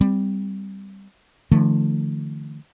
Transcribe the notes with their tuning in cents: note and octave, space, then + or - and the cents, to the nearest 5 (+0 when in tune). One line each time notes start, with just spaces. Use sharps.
G3 +0 C4 -15
D3 +35 F3 -35 A3 +0